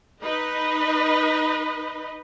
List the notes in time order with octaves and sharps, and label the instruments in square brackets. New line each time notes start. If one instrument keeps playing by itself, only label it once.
[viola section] D#4 B4 D#5